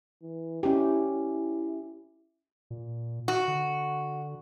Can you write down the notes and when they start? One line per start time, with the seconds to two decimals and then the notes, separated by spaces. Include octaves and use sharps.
0.23 E3
0.63 C#4 E4 G4
1.14 E4
2.71 A#2
3.28 F#4
3.48 D3